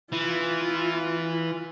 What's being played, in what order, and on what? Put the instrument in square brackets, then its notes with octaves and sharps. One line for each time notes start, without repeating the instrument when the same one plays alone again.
[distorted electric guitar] E3 [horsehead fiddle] F4